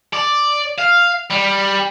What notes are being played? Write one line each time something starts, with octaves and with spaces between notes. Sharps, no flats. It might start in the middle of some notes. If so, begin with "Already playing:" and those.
D5
F5
G3